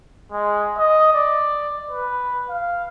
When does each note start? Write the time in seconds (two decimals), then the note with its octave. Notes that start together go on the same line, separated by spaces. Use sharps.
0.32 G#3
0.77 D#5
1.13 D5
1.91 B4
2.49 F5